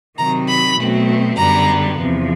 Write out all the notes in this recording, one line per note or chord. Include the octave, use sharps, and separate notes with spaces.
C3 D#3 F#3 A#5
B5
B2 F#3 A3 C4
F#2 D3 G3 B3 A#5
E2 C3 F3